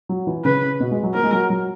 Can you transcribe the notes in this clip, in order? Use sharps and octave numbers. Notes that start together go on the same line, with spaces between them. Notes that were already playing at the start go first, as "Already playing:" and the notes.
F#3
E3
C#3 B4
B2
G#3
F#3
A#3 A#4
G#3
F#3
F#3